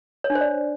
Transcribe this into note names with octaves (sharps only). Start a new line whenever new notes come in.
C#5
D4
C5
D5